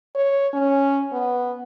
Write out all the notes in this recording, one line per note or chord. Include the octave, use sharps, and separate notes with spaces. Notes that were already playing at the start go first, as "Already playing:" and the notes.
C#5
C#4
B3